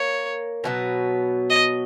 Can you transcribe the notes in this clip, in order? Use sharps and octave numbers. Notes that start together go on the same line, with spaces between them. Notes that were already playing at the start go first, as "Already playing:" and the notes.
Already playing: A#3 C#5
B2 F#3 B3
D#5